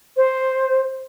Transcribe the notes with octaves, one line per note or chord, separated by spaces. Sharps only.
C5